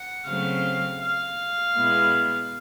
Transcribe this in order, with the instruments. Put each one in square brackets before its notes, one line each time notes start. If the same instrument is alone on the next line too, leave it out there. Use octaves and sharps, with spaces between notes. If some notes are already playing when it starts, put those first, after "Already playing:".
Already playing: [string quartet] F#5
C#3 F#3 A3 C4 F5
F5
B2 G#3 B3 E4